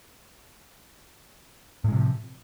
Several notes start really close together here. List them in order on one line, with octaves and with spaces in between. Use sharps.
A2 G#3 C3 F3